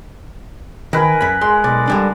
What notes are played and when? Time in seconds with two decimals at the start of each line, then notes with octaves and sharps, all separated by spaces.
0.93 D#3 A#4 B4 G#5
1.21 F#2 B5
1.41 G#3 C6
1.64 B1 D5
1.88 D3 G3 D4